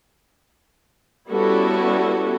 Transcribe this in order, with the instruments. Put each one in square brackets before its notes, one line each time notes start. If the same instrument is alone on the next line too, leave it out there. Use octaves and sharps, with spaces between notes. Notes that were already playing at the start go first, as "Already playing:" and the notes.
[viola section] G3 B3 C#4 E4 F#4 A4